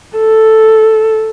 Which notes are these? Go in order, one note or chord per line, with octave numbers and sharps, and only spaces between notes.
A4